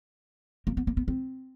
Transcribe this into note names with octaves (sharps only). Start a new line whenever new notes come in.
A#3
B3
A#3
B3
C4